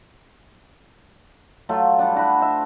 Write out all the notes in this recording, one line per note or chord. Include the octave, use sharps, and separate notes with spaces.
F#3 A3 F4
G3 D4
D4 F#4 B5
C5 E5